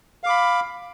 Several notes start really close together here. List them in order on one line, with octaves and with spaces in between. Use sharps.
F5 D6 B5